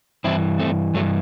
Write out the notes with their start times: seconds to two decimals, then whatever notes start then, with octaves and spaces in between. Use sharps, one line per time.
0.24 G2 E3 C4 E4
0.59 A3 C4
0.94 G2 F#3 A3
0.99 E3